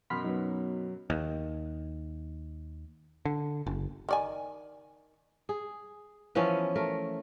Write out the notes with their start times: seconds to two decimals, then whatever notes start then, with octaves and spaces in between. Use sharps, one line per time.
0.10 F#2 B2 B5 C6 F6 B6
0.25 F#3 B3 D#4
1.10 D#2
3.25 D3
3.66 F#1
4.09 D#3 D5 G#5
5.49 G#4
6.35 E3 F3 B3 C#4
6.75 A3 A#4